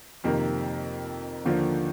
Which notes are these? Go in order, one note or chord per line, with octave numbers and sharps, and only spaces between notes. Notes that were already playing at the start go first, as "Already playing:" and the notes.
F2 C3 D#3 A#3
D#2 D3 F3 A#3